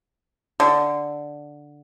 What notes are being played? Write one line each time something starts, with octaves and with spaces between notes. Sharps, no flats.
D3